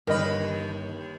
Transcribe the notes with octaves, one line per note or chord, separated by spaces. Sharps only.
G1 D#2 A#4 B4 D#5